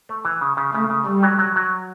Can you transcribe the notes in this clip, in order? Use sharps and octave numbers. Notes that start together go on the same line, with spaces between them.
A3
E3
C#3
C#3
C#3 A3
C#3
G3 A3
F#3
F#3
F#3